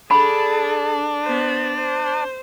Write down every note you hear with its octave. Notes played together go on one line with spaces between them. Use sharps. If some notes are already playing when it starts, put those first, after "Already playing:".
D4 G#4 A4 B5
B3 C5
C5